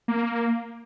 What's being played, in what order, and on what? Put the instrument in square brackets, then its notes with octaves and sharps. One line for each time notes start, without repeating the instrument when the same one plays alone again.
[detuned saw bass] A#3